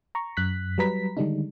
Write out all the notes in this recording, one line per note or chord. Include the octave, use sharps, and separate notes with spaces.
A#5 C#6
F#2 F#6 B6
F#3 G3 B4 A#5 B6
D3 D#3 G3 G#3 D4 D#4